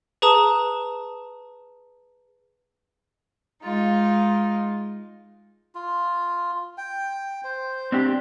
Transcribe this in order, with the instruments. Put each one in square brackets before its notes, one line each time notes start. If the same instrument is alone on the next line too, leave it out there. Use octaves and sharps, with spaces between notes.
[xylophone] G#4 B4 A5 A#5 D#6 E7
[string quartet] G#3 D#4 F4
[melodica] F4
G5
C5
[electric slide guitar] C4 D4 G4